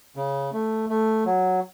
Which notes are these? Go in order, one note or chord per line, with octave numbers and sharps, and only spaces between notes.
C#3
A3
A3
F#3